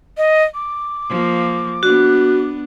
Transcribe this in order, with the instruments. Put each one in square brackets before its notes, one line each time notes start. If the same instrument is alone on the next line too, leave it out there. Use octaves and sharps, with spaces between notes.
[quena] D#5
D6
[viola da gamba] F3 A#3
[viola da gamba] B3 D4 [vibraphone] F#4